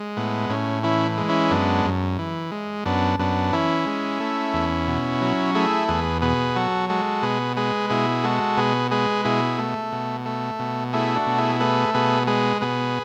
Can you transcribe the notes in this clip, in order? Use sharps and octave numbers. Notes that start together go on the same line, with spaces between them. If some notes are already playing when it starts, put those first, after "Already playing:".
Already playing: G#3
A2 B3
A2 C#4
E3 C#4 E4
G#3
C#4 E4
F#2 B3 D4
F#2
E3
G#3
F#2 B3 D4
F#2 B3 D4
E3 C#4 E4
G#3
A3
E2
B2
F#3
A3 E4 G#4
E2 G#4 B4
B2 G#4 B4
F#3 F#4 A4
G#3 F#4 A4
B2 G#4 B4
G#3 G#4 B4
B2 E4 G#4
G#3 F#4 A4
B2 G#4 B4
G#3 G#4 B4
B2 E4 G#4
A3
B2
A3
B2
A3 E4 G#4
D4 F#4
B2
E4 G#4
A3 G#4 B4
B2 G#4 B4
G#3 G#4 B4
B2 G#4 B4